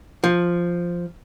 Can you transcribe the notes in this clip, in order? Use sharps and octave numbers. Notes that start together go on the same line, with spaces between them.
F3